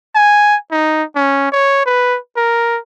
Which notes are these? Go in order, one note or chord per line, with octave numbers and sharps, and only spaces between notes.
G#5
D#4
C#4
C#5
B4
A#4